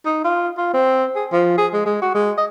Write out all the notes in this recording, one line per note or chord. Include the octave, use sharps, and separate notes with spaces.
D#4
F4
F4
C4
G#4
F3
G#4
G#3
G#3
F#4
G#3
D#5